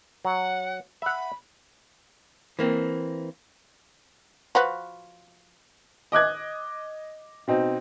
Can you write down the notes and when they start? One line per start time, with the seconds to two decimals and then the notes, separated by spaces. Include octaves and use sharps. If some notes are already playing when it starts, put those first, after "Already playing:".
0.25 F#3 F#5
1.02 E5 F#5 B5
2.59 E3 A#3 C4
4.55 F3 F#4 B4
6.12 D#5 D6 F#6 G#6
7.48 B2 C4 D#4